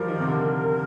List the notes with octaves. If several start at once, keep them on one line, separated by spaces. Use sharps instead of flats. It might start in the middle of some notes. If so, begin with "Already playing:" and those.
Already playing: F3 G3 A#4
D#3
C3
D3
C3